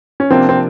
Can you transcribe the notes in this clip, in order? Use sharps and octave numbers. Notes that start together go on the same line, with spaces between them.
C#4
C3 F3 A#3 C4 D4 F4
C4